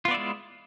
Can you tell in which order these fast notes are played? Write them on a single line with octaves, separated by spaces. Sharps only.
F4 B3 D5 E4 G#3